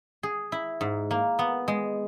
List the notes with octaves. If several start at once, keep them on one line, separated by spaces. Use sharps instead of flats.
G#4
E4
G#2
A#3
B3
G#3